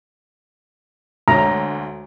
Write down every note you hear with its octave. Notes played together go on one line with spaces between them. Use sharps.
D2 G#3 C#5 A#5